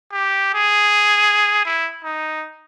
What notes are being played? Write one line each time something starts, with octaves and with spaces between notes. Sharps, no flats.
G4
G#4
E4
D#4